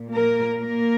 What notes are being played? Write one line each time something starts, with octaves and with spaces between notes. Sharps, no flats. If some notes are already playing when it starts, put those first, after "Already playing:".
Already playing: A#2
A#3 A#4
A#3 A#4